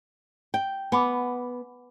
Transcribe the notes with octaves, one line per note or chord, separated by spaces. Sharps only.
G5
B3 G#5 B5 D6